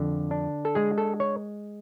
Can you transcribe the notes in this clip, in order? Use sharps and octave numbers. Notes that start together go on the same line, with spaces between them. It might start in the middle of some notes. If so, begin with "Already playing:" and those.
Already playing: F2 D3
D4
A4
G#3 G#4
A4
C#5